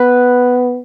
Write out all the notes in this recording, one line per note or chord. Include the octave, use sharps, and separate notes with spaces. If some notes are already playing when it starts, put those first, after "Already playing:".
Already playing: B3 B4